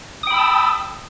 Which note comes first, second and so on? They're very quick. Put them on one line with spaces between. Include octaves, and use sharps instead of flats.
D#6 G5 B5 E6 A5